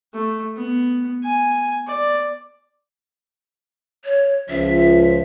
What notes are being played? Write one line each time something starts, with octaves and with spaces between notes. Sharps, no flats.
A3
B3
G#5
D5
C#5
C#2 F3 E5